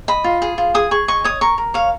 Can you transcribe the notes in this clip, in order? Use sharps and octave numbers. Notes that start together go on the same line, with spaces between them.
D#5 B5
F4
G#4
F4
G#4 D#6
G#4 C#6
D#5 C#6
C#5 D#6
A#4 C#6
A#4
C#5 F5